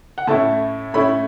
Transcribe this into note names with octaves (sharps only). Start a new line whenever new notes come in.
F#5
A2 A3 C#4 E4 A5
A2 A3 C#4 E4 B5